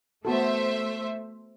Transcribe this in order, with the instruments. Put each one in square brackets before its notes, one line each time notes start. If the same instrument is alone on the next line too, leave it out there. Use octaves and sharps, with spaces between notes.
[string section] A3 C5 E5 [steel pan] B3 F#4 A4